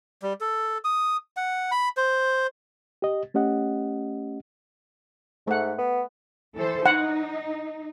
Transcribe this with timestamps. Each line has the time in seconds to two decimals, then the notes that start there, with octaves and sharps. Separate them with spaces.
0.22 G3
0.41 A4
0.84 D#6
1.37 F#5
1.72 B5
1.97 C5
3.02 G4 D#5
3.34 A3 C#4 G4 D#5 F#5
5.47 G#2 A3 F#5
5.79 B3
6.55 E3 A4 C5
6.86 D#4 F#5